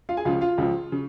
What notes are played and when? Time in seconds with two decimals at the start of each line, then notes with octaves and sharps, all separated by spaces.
0.09 F4 F5
0.17 G#4 G#5
0.25 C#2 C#3 F3 F4 F5
0.41 F4 F5
0.58 C#2 C#3 F3
0.92 C#3